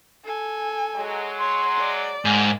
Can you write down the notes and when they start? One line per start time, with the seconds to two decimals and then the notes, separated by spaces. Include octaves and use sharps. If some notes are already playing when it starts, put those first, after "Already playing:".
0.25 A4 G#5
0.96 F#3 G#3
1.39 C#5 C6
1.77 D5
2.25 G#2 D#3 A#3 G#5